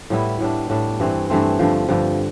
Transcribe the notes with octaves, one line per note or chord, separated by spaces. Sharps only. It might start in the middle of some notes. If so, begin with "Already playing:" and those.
A2 G3 B3 E4
A2 G3 D4
A2 G3 D4
G2 E3 A3 C4
G2 E3 A3 C4
G2 D3 F3
G2 D3 F3